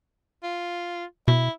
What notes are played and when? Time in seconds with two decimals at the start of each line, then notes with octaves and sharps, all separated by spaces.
0.43 F4
1.28 B2 E4